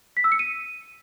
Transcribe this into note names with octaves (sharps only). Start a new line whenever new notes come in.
B6
E6
C#7
D#7